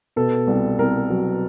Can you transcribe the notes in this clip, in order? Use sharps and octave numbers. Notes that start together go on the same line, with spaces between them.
B2 A4
C2
C2 A#4
F#3